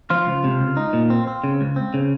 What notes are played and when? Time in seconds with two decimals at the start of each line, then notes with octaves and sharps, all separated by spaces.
0.10 F3 F4
0.27 C#2
0.44 C3
0.60 C#2
0.77 D#4
0.93 A#2
1.10 C4
1.27 C4
1.44 C#3
1.61 C#2
1.76 C4
1.94 C#3